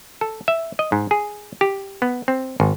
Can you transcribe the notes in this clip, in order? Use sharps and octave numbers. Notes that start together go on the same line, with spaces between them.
A4
E5
D#5
G#2
G#4
G4
B3
C4
G#1